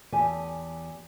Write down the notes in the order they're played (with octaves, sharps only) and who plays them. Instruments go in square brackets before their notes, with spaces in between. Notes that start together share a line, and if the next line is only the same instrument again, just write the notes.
[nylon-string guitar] E2 G4 G#5 A5